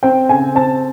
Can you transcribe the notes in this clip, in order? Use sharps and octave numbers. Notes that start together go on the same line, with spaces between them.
C4 G5
C#3 G#5
C4 A5